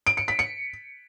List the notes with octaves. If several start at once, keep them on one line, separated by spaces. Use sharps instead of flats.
D7
C#7
B6
C#7